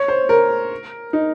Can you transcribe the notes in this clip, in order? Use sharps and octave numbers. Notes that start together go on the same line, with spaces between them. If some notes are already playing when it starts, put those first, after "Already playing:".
Already playing: C#5
C5
A#4
D#4